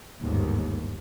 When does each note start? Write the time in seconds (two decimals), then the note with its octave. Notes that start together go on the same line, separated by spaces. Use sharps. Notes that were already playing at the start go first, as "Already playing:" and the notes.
0.20 G1 D#2 G#2